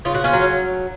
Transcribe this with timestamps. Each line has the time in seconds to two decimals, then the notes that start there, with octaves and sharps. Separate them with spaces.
0.05 C#3 F4
0.15 F#4
0.24 C#4 F4
0.33 F#3